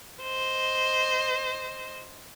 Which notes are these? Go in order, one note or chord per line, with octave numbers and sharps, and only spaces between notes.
C5 D#5